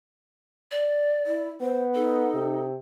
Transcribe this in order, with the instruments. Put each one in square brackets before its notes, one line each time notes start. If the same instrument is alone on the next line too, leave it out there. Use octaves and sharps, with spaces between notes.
[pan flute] D5
[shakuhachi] E4
[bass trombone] B3 [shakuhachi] C5
[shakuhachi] D#4 [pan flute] A4
[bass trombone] C3